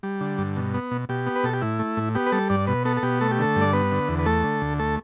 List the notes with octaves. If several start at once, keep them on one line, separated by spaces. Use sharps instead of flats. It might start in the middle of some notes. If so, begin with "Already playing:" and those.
G3
D3
G2
B2
B3
B2
B2 G4
B3
B4
B2 A4
G4
A2 E4
A3
A2
B3 G4
B4
G3 A4
G2 D5
B2 B4
B3 A4
A4
B2 G4
A3 A4
G4
D3 A4
G2
D5
B3 B4
D3
E2
B4
A3 A4
D3
D2
A3 A4